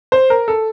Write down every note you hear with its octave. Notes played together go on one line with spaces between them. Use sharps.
C5
A#4
A4